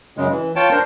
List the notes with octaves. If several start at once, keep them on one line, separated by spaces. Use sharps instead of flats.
F#2 C#3 G#3
E3
F4 C#5 G5 A5
D4 A#4 C5